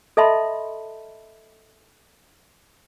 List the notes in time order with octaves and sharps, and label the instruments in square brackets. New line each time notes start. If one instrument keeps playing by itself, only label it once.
[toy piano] A4 D#5 E5 A5 B5 C6